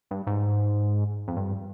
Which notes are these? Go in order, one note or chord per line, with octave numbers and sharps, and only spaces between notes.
G2
G#2
F2
G2